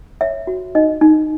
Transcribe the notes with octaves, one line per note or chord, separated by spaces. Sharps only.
C#5 E5
F#4
D#4 D#5
D#4